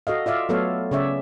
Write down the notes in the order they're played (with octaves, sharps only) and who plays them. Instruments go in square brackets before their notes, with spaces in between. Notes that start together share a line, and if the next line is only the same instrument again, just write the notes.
[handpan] F#4 A4 D#5 F5
F4 D5 E5 F5
F#3 A3 B3 A4 C#5 F5
C#3 C#4 C#5 D5 E5